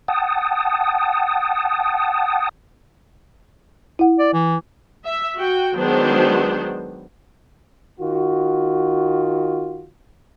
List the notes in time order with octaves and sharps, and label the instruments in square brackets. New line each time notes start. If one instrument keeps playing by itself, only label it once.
[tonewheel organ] F#5 G5 A5 D#6
[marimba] E4 F#5
[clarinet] D5
E3
[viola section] E5
F#4 G5
D#3 F#3 G#3 B3 D4 C5
[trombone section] D#3 F4 F#4